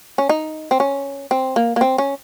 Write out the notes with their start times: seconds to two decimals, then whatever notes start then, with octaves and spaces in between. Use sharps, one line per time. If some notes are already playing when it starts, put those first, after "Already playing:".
0.18 C#4
0.29 D#4
0.71 C4
0.80 C#4
1.31 C4
1.56 A#3
1.76 A#3
1.81 C4
1.98 C#4